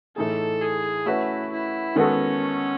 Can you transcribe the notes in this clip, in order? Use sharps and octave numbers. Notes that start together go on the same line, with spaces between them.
A2 E3 A3 D#4 G#4 A4
G#4
A3 C#4 E4 F#4 B4
E4
D#3 G#3 B3 C#4 F#4 A4